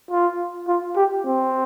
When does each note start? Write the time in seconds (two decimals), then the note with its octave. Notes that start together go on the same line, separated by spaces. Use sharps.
0.11 F4
0.68 F4
0.96 G4
1.25 C4